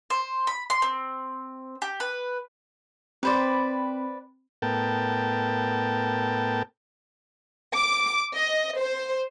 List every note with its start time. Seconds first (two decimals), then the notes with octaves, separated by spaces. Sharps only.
0.10 C5
0.47 B5
0.70 C6
0.82 C4
1.82 G4
2.00 B4
3.23 C4 B4 C5 D5 B5
4.62 A2 B3 A#4 G5 A5
7.74 D6
8.33 D#5
8.77 C5